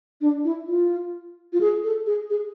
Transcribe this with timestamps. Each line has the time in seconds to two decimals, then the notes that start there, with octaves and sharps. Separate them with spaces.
0.21 D4
0.45 E4
0.67 F4
1.53 F4
1.61 G#4
1.84 A4
2.06 G#4
2.30 G#4